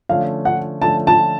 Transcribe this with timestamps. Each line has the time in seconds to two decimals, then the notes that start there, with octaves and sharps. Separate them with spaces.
0.09 D3 F3 A3 C#4 F5
0.45 F#5
0.82 D3 F3 A3 C#4 A5
1.07 A5